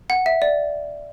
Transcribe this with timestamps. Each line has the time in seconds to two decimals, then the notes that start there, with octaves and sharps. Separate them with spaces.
0.10 F#5
0.26 E5
0.42 D5